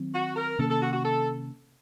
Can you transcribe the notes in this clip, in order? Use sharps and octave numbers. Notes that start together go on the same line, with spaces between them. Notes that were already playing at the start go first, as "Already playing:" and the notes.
Already playing: D#3 F#3 C4
F#4
A#4
C3 D#3 A#3 C#4 A4
A4
F#4
F#4
A4